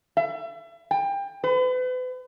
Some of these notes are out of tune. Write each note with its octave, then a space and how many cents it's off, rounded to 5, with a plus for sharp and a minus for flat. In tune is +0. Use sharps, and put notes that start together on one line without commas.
E5 +35
G5 +25
B4 +40